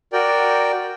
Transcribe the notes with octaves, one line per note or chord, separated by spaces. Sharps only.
F#4 A#4 D5 G5